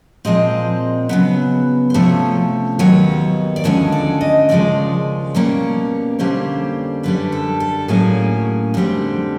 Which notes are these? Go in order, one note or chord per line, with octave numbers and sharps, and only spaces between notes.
A#2 F3 G#3 C4 D#5
C#3 F#3 B3
C5
C3 F3 A3 C#4 C#5
D#2 D#3 F#3 B3 C#5
D5
D2 D3 F3 G#3 C#4 C#5
D5
D#5
D#2 C#3 F3 G#3 D5
B2 G3 A#3 C#4 C#5
F2 D3 G3 A#3 C#4 C5
F#2 D3 G3 B4
A4
A4
A2 F#3 A#3 C#4 G#4
F2 D3 G3 C4